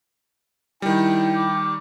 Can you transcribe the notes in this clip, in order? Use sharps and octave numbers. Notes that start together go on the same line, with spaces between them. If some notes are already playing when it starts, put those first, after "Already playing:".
D#3 G3 E4 G5
D6